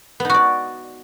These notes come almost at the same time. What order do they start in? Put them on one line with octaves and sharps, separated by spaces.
B3 D#4 F#4 D5